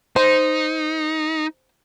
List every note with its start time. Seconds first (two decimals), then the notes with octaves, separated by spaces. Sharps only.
0.16 D#4 C5